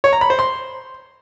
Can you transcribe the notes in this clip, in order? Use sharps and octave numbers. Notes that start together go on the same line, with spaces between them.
C#5
A#5
B5
C5
C6